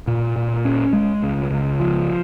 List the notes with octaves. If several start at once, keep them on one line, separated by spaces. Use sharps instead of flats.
A#2
A#2
C#4
G#3
C#2
C#2
F3